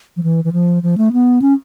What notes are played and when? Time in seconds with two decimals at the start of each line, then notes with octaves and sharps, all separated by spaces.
0.17 F3
0.23 E3
0.44 E3
0.53 F3
0.83 F3
0.98 A3
1.13 B3
1.42 C#4